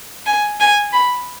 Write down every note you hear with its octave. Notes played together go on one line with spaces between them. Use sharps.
G#5
G#5
B5